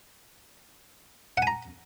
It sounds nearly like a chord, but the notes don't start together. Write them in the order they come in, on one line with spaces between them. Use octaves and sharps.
F#5 G#5 A#5